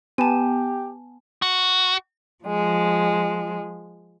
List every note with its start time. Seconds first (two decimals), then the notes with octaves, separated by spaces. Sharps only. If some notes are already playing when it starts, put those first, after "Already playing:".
0.18 B3 G4 G#5 A5
1.42 F#4
2.45 F3 G#3